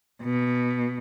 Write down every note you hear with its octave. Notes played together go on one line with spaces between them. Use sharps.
B2